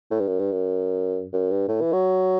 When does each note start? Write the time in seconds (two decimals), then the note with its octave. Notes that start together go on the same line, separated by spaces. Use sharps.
0.11 A2
0.20 G2
0.27 F#2
0.40 G2
0.52 F#2
1.33 F#2
1.51 G2
1.68 A2
1.81 E3
1.93 F#3